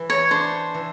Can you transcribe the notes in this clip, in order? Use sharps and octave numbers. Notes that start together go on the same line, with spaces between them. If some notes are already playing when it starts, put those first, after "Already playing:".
Already playing: E3
C#5
D4 C5
E3